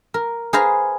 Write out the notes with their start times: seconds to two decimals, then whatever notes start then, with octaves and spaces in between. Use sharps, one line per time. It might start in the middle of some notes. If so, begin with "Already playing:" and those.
0.14 A#4
0.53 G#4 B4 C5 F5 A#5